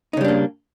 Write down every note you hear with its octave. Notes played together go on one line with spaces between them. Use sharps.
C#3 G3 A#3 D4 D#4